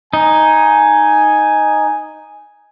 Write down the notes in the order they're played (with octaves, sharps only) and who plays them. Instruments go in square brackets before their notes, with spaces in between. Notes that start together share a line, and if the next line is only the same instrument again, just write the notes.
[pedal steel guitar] D#4 [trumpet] G#5